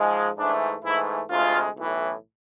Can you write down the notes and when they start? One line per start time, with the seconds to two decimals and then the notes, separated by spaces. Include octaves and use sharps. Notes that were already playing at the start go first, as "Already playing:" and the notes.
Already playing: G#2 F3 G#3
0.38 G#2 E3 A3 D4
0.84 G#2 E3 A3 E4
1.30 D2 C3 G#3 F4
1.76 B1 A2 E3